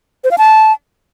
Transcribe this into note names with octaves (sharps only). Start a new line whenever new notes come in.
C5
F5
A5